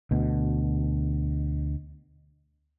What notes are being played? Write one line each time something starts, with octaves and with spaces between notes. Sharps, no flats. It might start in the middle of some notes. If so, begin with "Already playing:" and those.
D2 B2